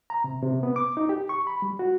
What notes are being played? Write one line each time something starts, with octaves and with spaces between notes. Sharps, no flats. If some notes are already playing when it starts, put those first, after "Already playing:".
A#5
C3
C3
B3
D6
D#4
G4
C#6
B5
G3
F#4